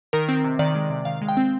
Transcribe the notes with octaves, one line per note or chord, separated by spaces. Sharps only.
D#3 A#4
C4
C3
D#3 D5
G#3
C3
D#3 F5
G#3
G5
C4